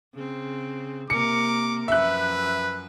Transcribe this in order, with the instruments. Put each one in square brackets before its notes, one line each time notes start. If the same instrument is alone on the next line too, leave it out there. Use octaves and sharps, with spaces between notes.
[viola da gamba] C#3 C4
[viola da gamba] C3 A#3 A#4 [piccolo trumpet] D6 [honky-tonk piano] C#7
[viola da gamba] F#2 F3 [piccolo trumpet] B4 [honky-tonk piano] E5 F#6